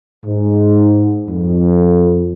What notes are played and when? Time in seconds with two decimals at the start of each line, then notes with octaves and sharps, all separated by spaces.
0.25 G#2
1.29 F2